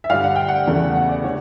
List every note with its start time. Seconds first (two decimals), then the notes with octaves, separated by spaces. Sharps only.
0.04 E5
0.09 G2 D3 G3 F5
0.24 F#5
0.36 G5
0.48 F#5
0.67 E2 C#3 E3 A3
0.96 F#5
1.09 D5
1.24 D3 G3 C#5